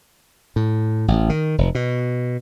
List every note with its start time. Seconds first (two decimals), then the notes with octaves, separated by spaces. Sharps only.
0.56 A2
1.08 A1
1.29 D#3
1.58 F1
1.75 B2